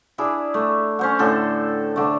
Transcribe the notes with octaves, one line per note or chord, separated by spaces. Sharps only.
D4 E4 G#4
A3
C#4 C5 F#5
A2 D3 A4
D3 A3